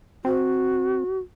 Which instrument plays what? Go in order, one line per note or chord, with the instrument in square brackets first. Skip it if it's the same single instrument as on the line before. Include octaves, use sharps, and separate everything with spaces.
[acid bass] C4 [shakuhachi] F#4